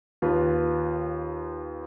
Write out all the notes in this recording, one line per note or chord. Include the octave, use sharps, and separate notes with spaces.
D#2 F4 B4